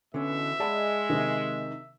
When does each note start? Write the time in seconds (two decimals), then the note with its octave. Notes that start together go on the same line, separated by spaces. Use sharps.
0.14 B2 D3 E3 C#4 E5
0.60 G#3 G#4 D5 F#5 A5 B5
1.10 C3 D#3